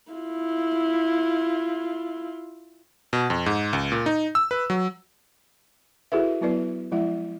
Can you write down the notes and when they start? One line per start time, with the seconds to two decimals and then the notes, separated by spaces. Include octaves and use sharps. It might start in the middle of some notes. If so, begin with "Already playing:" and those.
0.12 E4 F4
3.13 B2
3.30 F2
3.46 G#2
3.73 C#2
3.92 A#2
4.06 D#4
4.35 E6
4.51 B4
4.70 F#3
6.12 E4 F#4 G#4 A4 B4 E5
6.41 F#3 B3 E4 B4 D5
6.92 F3 G#3 E4 E5